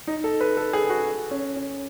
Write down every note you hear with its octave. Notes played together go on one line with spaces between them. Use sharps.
D#4
A4
B4
A4
G#4
F#4
C#4
C#4